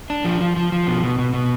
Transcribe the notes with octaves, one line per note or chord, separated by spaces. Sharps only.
D4
F3
F3
F3
F3
B2
B2
B2
B2